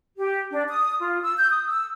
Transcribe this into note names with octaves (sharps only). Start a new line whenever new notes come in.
G4
D4
D#6
F4
E6
G6
D#6
E6